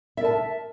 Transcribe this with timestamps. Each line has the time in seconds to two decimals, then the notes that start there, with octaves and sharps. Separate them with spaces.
0.17 E5
0.21 A#4
0.25 A5